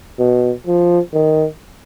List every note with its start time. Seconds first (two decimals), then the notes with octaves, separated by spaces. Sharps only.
0.19 B2
0.67 F3
1.13 D#3